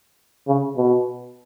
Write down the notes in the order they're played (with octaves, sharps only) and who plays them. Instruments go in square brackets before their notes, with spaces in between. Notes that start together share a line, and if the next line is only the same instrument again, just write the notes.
[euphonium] C#3
B2